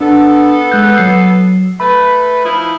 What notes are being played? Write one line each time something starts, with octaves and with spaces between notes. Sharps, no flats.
B3 D4 A4
G#3 F#6 G6
F#3 C7
A3 B4 B5
F3 D#4 E4